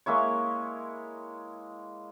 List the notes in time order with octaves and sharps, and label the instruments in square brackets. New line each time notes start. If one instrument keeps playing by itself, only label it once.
[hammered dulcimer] G#3 A#3 E4 C#5